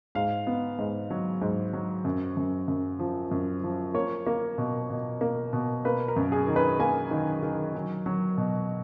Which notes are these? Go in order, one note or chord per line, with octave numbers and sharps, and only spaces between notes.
G#2 F5
B3
G#2
F#3
G#2
F#3
F#2
F#2
F#2
F3
F#2
F3
A#3 C#5
A#3
B2
B2
A#3
B2
A#3 B4
A#4
F#2
G#4
D#3
B4
A#3 G#5
D#3
D#3
F#3
F#3
B2